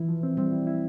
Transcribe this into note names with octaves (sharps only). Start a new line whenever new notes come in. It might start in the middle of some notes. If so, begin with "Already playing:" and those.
Already playing: E3 E4
F3
C4
G3 C4
E4
E4